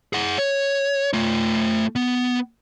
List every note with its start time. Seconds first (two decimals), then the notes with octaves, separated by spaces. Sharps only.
0.13 G#4 F#5
0.38 C#5
1.13 A3 F4
1.96 B3